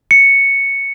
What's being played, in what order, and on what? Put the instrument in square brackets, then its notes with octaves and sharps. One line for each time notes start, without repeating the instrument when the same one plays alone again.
[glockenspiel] C#7